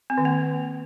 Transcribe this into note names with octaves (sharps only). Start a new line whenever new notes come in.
C4
D#3
A#3